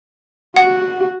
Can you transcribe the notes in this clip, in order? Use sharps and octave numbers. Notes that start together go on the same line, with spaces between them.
F#4 F#5